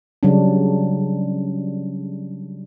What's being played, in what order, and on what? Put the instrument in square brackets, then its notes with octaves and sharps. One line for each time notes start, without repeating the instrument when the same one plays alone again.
[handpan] C#3 F#3 G3 C#4 D4